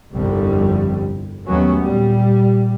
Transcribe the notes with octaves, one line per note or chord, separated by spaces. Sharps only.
G1 C2 F2 D3 G3
D#2 F#3 A3 B3 C#4
A#2 G3